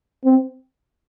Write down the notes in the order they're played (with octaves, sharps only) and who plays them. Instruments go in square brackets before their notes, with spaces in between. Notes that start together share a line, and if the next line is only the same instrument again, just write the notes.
[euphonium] C4